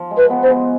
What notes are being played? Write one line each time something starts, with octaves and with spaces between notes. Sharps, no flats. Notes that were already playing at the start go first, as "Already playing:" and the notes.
Already playing: F3
G#3
B4
B3
C5
G#3